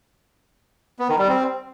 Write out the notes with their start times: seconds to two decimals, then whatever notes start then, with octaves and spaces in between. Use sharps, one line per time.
0.99 B3
1.09 D#3
1.19 G3
1.29 C4